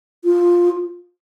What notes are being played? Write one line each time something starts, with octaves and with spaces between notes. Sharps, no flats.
F4